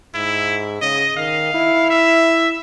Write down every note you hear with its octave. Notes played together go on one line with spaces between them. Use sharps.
G#2 E4
C#3 D#5
D#3 F5
E4
E5